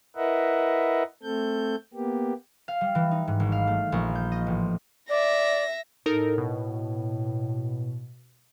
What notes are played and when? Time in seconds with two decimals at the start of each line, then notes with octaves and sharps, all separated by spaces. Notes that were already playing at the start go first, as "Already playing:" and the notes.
0.16 E4 A#4 B4 D#5 E5 F#5
1.23 A3 C4 A4 G6
1.94 A#3 B3 G4
2.68 F5
2.81 G3
2.95 E3
3.11 D#4
3.27 G#2
3.40 G#1
3.52 F5
3.67 A3
3.92 A#1
4.15 G6
4.32 D#5
4.47 A1
5.10 D5 E5 A#6
6.06 A2 D#4 A4 A#4
6.38 B2